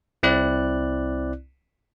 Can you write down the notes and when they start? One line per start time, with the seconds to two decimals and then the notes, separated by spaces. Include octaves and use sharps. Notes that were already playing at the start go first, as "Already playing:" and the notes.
0.23 C2 C4 E4 D5 F#6